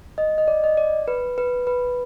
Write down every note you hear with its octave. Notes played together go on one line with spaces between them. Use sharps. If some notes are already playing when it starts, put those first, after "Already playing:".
D#5
D#5
D5
D#5
D5
B4
B4
B4